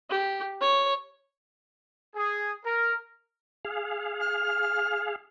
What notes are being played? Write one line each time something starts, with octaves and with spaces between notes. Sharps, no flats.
G4
C#5
G#4
A#4
G#4 F5
F6